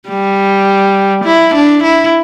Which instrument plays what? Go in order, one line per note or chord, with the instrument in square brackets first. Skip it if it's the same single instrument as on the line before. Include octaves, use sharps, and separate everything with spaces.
[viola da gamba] G3
E4
D4
E4